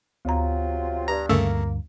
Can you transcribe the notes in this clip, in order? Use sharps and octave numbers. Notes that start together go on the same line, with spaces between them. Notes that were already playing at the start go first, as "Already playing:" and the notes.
D2 C3 F#3 F4 A#5
G2 A#5
D2 G2 C#3 A3 A#3 E6